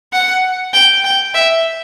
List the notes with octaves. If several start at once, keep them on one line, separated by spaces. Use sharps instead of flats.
F#5
G5
G5
E5